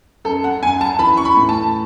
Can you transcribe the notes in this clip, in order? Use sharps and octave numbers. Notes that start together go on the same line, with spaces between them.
F#2 A4
F#5
F#2 G#5
A5
E3 B5
C#6
B5
A2
A5